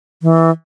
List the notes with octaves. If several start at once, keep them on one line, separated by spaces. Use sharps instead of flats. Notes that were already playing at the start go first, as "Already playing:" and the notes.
E3